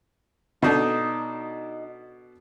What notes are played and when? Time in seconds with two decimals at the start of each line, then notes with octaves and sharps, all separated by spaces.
0.62 B2 D4 D#4 A4